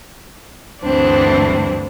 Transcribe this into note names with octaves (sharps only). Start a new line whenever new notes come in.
D2 G2 E3 C4 D4